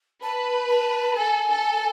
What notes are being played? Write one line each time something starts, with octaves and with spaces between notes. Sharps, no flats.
B4 A5
A5
A4 G#5
A4